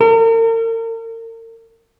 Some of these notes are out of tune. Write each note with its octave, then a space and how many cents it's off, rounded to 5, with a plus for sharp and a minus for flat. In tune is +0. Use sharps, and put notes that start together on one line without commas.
A#4 -40